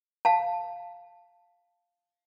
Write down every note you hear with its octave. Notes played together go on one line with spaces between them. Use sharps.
F5 A5